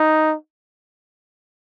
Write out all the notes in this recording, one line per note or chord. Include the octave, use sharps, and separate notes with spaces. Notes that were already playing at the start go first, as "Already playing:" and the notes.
Already playing: D#4